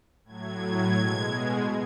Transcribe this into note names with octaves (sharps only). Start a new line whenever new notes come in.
A2 F#3 G#6
B2 G#3